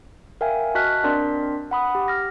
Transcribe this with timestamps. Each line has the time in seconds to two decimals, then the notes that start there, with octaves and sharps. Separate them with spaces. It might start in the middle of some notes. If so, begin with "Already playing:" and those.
0.41 A#4 E5 F5 G5 G#5
0.75 F#4 D#5 A5 F6 F#6 B6
1.04 C4 D4 A#4 D5 C6 B6
1.71 F#5 B5 D#6
1.95 G4
2.08 F6 A#6